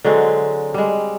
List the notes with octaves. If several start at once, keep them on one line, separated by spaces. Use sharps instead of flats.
D3 F#3 G#3 C4
G3 G#3